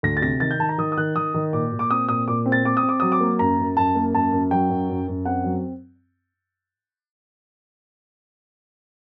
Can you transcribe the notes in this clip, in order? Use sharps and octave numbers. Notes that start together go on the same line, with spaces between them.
D2 A#6
A6
C3 A#6
D#3 A6
G6
D#3 A5
A#5
D#3 D#6
D#6
D#3 F#6
D#3 D#6
D#3
A#2 D6
A#2
D6
C4 D#6
A#2 D#6
A#2 D6
C4
A6
C4 D6
D#6
C4
D6
F#3 D#6
D6
A#3
F#2 A#5
F#2
F#2 A5
A#3
F#2 A5
F#2
F#3 G5
F#2
F#2
F#2
C4 F#5
F#3